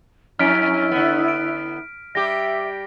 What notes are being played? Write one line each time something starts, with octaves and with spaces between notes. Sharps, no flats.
F2 C#4 E4 F6 B6 D7
D3 B3
D7
G3 G4 E5 A#6